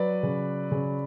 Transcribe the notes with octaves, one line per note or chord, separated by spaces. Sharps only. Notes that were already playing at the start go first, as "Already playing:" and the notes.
Already playing: F#3 B4 D5
C#3
C#3